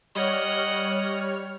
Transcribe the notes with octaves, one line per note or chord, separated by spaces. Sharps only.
G3 C#5 D#5 F#5 F6